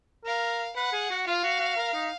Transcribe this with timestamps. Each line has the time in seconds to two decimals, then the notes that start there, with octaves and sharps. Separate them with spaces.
0.25 A#4 F5
0.76 B4 F#5
0.93 G#4
1.10 F#4
1.27 F4 F5
1.44 F#4
1.60 F#4
1.77 A#4
1.94 D#4